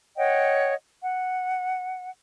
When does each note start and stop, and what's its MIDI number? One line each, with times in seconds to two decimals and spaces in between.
0.16 0.74 73
0.16 0.74 75
0.16 0.74 78
0.16 0.74 79
1.01 2.11 78